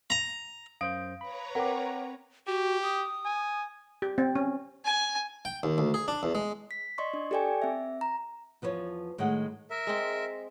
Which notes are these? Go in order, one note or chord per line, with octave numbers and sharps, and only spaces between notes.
A#5
F#2 C5 F5 D#6 G6 D7
B4 C#5 A#5 B5
C4 A#4 F#5 G5 D6
F#4 G4
D#6
G#5
G4
C4
C#4
G#5
G5
D#2
D2
G#4
D4
E2
G#3
B6
D5 D#5 C6 C#6
D4
G4 A4 D5 G5 G#5
C4 E5
A#5
E2 F3 B4 C#5
A2 D#3 G3 G#3 F#5
A#4 E5
G#3 C4